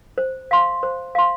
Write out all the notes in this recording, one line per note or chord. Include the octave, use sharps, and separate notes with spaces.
C5
F5 C6
C5
F5 C6